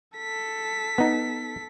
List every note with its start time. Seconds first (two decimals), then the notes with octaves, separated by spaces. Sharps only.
0.18 A4 B6
0.98 B3 D#4